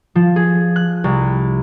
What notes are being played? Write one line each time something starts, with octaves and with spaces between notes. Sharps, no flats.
F3
G#4
F#6
C2